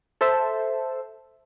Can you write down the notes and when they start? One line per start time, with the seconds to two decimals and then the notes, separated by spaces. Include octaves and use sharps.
0.21 A4 C5 E5